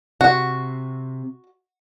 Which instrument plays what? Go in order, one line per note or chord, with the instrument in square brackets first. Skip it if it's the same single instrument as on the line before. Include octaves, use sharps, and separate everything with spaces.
[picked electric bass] C3 [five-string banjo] F#4